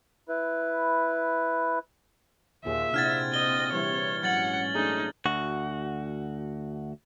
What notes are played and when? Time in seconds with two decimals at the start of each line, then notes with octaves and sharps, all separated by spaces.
0.29 E4 B4
2.65 D#2 A#2 F4 G#4 E5
2.94 C3 C4 D4 E4 F#5 F6 G#6 A6
3.34 D#5 G7
3.72 E3 G3 E4 C#5
4.23 G#2 F#3 C#4 F#5 G#6 A6 F#7
4.75 A3 D4 D#4 G#4
5.26 D2 F#4